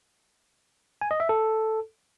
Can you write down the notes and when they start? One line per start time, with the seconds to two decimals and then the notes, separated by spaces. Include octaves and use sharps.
1.01 G#5
1.11 D#5
1.20 E5
1.29 A4